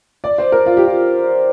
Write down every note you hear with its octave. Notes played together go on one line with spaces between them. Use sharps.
D5
C5
A#4
F4
G4
F4